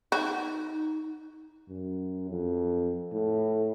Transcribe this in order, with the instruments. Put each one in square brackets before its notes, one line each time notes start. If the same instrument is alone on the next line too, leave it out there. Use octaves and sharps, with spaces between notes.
[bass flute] D#4 [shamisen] F#4
[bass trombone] F#2
F2
A2